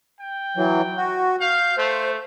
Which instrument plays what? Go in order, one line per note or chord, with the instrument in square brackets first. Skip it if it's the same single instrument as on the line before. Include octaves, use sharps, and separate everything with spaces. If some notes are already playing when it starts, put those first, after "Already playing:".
[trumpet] G5
[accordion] E3 F#3
F#4
[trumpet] F5 [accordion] G6
[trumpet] A3 [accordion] C5